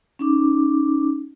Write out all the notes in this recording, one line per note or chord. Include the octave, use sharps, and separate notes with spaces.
C#4 D#4 D6